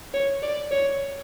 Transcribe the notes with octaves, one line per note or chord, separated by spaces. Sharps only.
C#5
D5
C#5